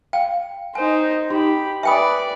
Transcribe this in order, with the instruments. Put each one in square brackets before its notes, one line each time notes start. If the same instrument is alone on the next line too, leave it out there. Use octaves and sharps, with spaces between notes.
[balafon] F5 [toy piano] G5
[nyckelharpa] D#4 C5 [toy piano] G#5
[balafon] D#4 [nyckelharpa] G4 B5
[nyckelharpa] B4 D5 [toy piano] E5 G5 D#6 [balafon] G#5 B5